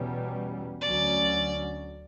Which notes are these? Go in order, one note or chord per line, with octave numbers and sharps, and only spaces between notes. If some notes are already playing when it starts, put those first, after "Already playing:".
Already playing: E2 B2 G3 C#4
D2 D3 F#3 C#4 D5